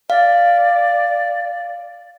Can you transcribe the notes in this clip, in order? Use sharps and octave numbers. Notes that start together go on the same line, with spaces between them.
D5 F5